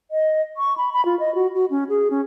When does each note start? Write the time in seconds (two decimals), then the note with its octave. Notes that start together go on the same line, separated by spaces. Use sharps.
0.11 D#5
0.57 C#6
0.77 B5
0.93 B5
1.05 F4
1.20 D#5
1.35 F#4
1.55 F#4
1.70 C#4
1.89 G#4
2.10 C#4